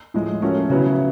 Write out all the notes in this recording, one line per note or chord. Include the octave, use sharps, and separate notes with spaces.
A2 F3 G#3
F3 A3 C#4 F#4 A#4
C#3 F#3 B3 E4